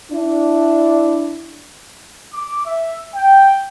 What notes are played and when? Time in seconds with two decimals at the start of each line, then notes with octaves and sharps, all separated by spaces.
0.12 D4 E4
2.34 D6
2.66 E5
3.15 G5